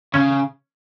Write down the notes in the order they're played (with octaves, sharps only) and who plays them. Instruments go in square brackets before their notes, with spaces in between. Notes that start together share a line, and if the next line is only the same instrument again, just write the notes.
[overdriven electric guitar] C#3 [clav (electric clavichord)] C#4